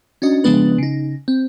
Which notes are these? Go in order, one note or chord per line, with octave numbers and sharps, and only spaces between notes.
C#4 D4 F#4 D#5
C#3 F3 G#3 B3 D4 B4
C#3 D#4
C4